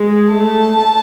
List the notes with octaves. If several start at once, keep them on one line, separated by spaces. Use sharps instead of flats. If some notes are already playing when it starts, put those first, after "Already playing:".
Already playing: G#3
A3 A5